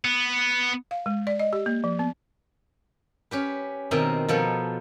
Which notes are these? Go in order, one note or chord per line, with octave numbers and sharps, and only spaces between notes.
B3
F5
G#3
D5
D#5
G4
A#3
F3
B3
C#4 G4 B4
B2 D#3 C4 A#4 D#5 E5
B2 F3 B3 A4 A#4